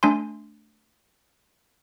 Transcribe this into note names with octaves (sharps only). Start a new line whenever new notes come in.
A3 D4 G#5 C6